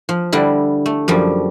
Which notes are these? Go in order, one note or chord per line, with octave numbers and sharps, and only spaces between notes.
F3
D3 G3 E4
A3
F#2 F3 G3